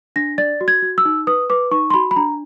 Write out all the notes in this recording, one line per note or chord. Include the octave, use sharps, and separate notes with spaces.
D4 A#6
D5 A6
F#4
G#6
F#4
E6
D#4
B4 D#6
B4 D6
D#4 C#6
C6
F#4 B5
B5
D4 A#5